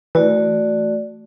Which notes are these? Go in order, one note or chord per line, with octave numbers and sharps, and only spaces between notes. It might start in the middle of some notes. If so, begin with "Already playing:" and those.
E3 A3 F#4 D5